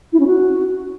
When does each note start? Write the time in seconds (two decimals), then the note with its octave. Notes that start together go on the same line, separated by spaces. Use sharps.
0.13 E4
0.20 C#4
0.27 F#4